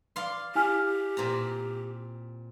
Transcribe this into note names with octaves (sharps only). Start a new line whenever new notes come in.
D5 F5 C6
E4 G4 G#5 F6
A#2 C4 A#5